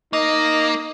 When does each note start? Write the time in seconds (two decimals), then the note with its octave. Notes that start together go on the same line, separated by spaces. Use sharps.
0.13 A#3 D#4 D#5